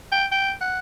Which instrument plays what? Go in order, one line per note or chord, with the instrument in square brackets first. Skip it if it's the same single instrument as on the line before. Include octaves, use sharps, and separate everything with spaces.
[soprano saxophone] G5
G5
F#5